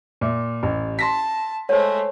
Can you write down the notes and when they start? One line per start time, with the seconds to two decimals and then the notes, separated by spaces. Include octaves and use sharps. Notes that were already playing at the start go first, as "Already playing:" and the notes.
0.21 A#2 E5
0.63 A1
0.99 A5 C6 A#6 B6
1.69 G#3 A3 C5 C#5